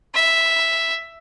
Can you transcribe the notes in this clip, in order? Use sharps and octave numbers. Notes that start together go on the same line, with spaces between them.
E5